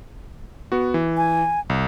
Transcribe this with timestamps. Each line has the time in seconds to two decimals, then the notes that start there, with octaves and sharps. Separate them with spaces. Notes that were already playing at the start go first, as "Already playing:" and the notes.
0.72 B3 F#4
0.94 E3
1.17 G#5
1.70 C2